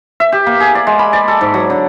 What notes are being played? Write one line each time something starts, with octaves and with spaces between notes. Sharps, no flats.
E5
G4
A#3
G#4
D5
G#3
B5
D5
A4
G#2
F#3
D3